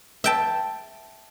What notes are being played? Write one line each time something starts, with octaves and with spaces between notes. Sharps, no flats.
E5 G5 A5